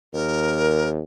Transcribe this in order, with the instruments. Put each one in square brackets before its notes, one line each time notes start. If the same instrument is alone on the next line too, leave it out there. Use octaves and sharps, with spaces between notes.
[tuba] D#2 [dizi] A#4